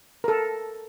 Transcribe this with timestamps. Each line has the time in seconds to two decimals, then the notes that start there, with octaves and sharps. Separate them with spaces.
0.24 A4 A#4